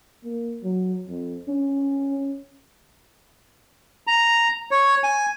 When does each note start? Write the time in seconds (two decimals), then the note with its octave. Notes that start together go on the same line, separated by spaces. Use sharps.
0.25 A#3
0.63 F#3
1.08 F2
1.48 C#4
4.07 A#5
4.71 C#5
5.04 G#5